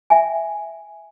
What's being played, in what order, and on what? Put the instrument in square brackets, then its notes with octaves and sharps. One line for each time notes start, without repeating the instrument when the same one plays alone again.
[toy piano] E5 G5 G#5